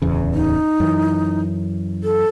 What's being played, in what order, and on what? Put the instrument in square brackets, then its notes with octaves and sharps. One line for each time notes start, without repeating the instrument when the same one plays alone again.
[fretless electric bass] D1 E2 C#3
[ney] D#4
[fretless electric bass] F#2 E3
[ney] A4